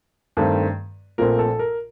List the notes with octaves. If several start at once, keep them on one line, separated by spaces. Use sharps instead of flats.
G2 D#3 A3 C4
A#1 A#2 A3 C4 A#4
A4
A#4